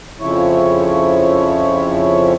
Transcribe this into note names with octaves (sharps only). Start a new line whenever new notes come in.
F2 C#3 F3 E4 C#5